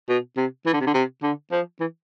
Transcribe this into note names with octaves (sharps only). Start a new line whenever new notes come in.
B2
C3
E3
D3
C3
D3
C3
D3
F3
E3